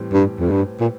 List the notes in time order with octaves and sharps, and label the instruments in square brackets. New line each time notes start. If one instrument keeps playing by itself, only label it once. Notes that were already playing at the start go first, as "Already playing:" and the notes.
Already playing: [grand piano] A2 E3 G3 C4 G4
[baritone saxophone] G2
F2
G2
A#2